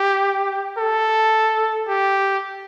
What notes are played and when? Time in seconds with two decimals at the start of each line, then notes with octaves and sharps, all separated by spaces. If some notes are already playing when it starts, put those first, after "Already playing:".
Already playing: G4
0.78 A4
1.88 G4